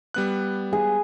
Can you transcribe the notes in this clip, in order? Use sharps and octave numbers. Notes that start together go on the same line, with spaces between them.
G3 B3 F#6
G#4